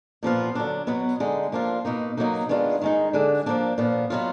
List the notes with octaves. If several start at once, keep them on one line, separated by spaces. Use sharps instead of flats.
A#2 F3 B3 F4
D3 F#3 D4
B2 F#3 B3
D3 G#3 D#4
F3 A#3 D4 F4
B2 A#3 D#4
B2 F#3 A#3 D#4
D#3 G#3 B3 D4 F4
D#3 G#3 D#4
D3 G#3 D4
F3 A#3 D4
A#2 F3 B3
B2 F#3 B3 F4